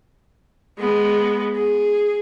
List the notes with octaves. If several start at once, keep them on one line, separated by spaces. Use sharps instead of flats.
G#3 B3
G#4